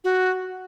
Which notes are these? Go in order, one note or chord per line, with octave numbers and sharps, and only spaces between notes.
F#4